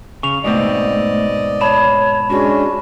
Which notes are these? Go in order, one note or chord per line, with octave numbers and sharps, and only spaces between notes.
C#3 C#6 F7
G#2 B2 A3 C4 D5 D#5
C#5 A5 B5 E7
G#3 C#4 D4 F#4